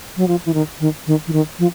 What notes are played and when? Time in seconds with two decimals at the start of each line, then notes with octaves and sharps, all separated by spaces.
0.17 F#3
0.28 F3
0.46 E3
0.54 D#3
0.80 D#3
1.07 D#3
1.27 E3
1.33 D#3
1.59 F3